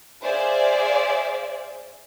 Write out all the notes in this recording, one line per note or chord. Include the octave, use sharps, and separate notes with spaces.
G#4 C5 D5 E5 F5